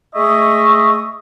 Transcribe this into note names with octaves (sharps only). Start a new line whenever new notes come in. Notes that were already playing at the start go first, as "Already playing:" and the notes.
G#3 A3 D#5 E5 C#6